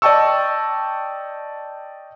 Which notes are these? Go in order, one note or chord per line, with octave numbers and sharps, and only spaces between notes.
D5 D#5 G5 A5 C#6 E6